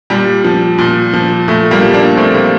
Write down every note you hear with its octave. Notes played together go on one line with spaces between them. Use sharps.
A#2 G3
F3
A#2
F3
A#2 A3
G3 A#3
F3
A#3 D4
A#2 A3 C4
G3 A#3